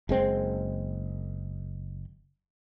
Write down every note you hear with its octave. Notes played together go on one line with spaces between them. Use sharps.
F#1 G#3 C4